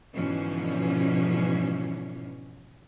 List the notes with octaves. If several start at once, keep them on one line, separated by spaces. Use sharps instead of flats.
G#2 B2 D3 E3 F3 C#4